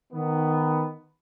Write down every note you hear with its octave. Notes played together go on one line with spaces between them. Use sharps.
D#3 B3